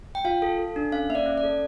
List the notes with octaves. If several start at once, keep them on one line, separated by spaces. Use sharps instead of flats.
G5
F4 F5
A4
A4
D4
C#4 F5
A#3 E5
D5
C#4
D5
A4